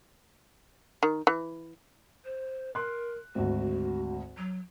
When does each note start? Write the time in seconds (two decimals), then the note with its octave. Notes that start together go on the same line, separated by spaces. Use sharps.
1.03 D#3
1.27 E3
2.25 C5
2.75 A#4 C6 F#6
3.35 G#1 D2 F#4
4.37 F#3